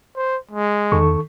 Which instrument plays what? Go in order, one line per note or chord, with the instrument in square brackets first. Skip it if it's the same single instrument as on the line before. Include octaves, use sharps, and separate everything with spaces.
[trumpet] C5
G#3
[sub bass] E2 [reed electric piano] D#3 A4 C#6